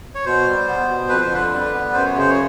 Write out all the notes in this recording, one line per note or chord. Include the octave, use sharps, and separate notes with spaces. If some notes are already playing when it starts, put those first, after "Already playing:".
C#5
B2 C5
G3
B3
B2
F2 B4
C5
D3 B4
G3
B3
F#2 C5
C#5
C#3 C5
C#5